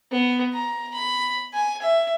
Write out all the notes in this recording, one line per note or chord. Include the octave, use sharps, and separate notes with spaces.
B3
A#5
B5
G#5
E5